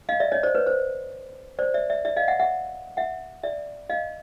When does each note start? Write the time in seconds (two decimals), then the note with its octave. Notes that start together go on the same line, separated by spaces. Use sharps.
0.09 D#5 F5
0.20 D5 E5
0.32 C#5 D#5
0.43 C5 D5
0.55 B4 C#5
0.67 C5
1.59 C5 D5
1.74 D5 E5
1.90 D5 E5
2.05 D5 E5
2.17 D#5 F5
2.28 E5 F#5
2.40 E5 F#5
2.97 E5 F#5
3.44 D5 E5
3.90 D#5 F5